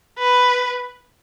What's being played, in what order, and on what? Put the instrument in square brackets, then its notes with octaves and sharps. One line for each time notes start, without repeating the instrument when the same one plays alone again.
[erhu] B4